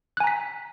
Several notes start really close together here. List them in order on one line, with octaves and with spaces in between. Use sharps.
F#6 G#5 A#5 B6